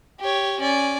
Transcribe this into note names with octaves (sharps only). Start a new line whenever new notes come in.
G4 C#5
C#4 D5